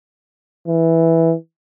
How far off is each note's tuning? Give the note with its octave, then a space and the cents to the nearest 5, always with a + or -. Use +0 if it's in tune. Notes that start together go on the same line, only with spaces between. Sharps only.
E3 -5